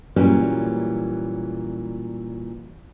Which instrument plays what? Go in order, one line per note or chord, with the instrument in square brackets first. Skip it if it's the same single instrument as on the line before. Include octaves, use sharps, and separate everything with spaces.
[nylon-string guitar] A#2 E3 F#3 G3 A#3 C#4